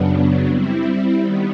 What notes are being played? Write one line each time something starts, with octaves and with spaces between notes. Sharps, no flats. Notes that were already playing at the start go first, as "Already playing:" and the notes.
Already playing: F#2 C#3 F#3 B3 D4
G3 C4 E4
D#3 G3 B3